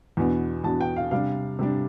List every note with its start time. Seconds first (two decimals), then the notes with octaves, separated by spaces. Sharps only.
0.17 E2 B2 B3 D4
0.64 E2 B2 B3 D4 A5
0.81 G5
0.96 F5
1.11 C3 G3 D4 F5
1.59 C3 G3 D4